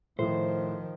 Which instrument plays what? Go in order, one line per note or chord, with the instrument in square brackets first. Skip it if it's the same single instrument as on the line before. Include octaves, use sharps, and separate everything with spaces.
[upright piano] A2 [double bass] D#3 F3 [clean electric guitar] C5